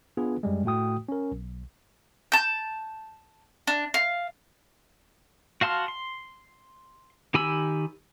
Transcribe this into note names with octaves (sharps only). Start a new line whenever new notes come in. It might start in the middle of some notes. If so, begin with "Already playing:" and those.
B3 D4 F4 G#4 B4
F#2 G3 G#3
A2 A3 F#4 G5 D#6
C#4 A#4
B1
A5 G6
D4
F5
F#4 F5 A5 C6 F6
C6
D#3 G4 G#5 B5 E6